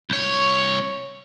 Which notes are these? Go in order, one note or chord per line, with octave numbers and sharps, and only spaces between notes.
C2 C#5